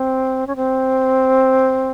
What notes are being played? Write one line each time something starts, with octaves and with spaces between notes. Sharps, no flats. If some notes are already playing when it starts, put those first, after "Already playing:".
Already playing: C4
C#4
C4